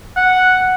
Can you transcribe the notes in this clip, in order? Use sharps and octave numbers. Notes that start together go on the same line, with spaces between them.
F#5